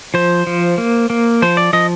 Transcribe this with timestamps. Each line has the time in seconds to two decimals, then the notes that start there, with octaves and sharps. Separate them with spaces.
0.14 F3 C5
0.47 F3
0.78 A#3
1.10 A#3
1.42 F3 C5
1.57 D5
1.73 F3 D#5